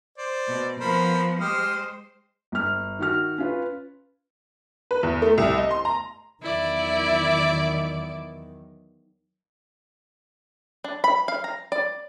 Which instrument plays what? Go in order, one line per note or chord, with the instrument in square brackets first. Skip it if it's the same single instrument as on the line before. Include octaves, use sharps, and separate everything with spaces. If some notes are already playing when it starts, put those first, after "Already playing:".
[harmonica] C5 D5
[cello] B2
[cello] F3 B3 [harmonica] A#4 C5 B5
[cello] G#3 C5 [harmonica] G4 D#6 F6
[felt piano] G1 F6
D#3 F#4 F6
C#4 F4 B4
[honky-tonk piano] B4
E2
A3
C2
D#5
C6
A#5
[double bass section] E2 D#3 F#3 [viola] E4 D5
[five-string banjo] D4
B5
F5
A#5
D5